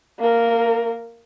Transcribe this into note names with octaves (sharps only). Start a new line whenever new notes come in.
A#3 A#4